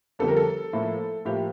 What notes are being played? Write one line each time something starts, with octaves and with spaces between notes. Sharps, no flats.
F2 D3 G3 B3 A4
A#4
A4
A2 F3 A#3
A2 F3 A#3 G4